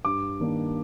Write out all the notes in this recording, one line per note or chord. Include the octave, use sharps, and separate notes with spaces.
G2 D6
D#3 A#3 D4